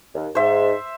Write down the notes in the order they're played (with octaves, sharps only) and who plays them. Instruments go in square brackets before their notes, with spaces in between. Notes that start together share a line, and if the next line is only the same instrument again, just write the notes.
[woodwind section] D#2
[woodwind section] G#2 [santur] C5 E5